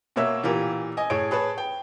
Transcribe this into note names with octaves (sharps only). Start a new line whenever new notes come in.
B2 A#3 C#5 E5 E6
A#2 E3 F4 G4 A#4
D#5 G#5
A2 G#4 C#5 D7
G#4 B4 C#5 A5
G5